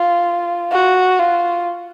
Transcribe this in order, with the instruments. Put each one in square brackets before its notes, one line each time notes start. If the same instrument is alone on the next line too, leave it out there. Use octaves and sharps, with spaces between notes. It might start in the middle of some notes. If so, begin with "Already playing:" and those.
Already playing: [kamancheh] F4
F#4
F4